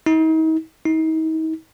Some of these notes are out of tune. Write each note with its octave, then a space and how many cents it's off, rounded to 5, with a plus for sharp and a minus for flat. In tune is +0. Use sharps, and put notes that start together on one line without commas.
D#4 +40
D#4 +40